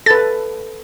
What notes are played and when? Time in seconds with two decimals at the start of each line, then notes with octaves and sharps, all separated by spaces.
0.06 A4 B4 A6